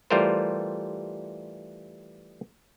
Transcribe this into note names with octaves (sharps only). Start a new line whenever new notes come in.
E3 G3 A3 F4 A#4 C5